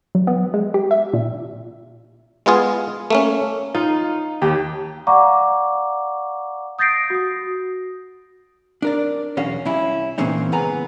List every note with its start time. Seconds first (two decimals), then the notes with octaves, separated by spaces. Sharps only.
0.15 F#3
0.27 B3
0.54 G#3
0.74 G4
0.91 E5
1.14 A#2
2.46 G#3 B3 F4 G#4
3.10 A3 A#3 C#4
3.75 D#4 F4
4.42 D#2 G4
5.07 D5 F5 F#5 A#5 C#6 D6
6.79 D#6 G6 A6 A#6 C7 D7
7.10 F#4 D#6
8.82 D4 A#4 D5
9.37 B1 E2 C#4 F#4 F5
9.65 C2 C#4 E4
10.18 A#2 E3 A#3 C4 C#4 D#4
10.52 C#2 G#3 B3 G#5 A#5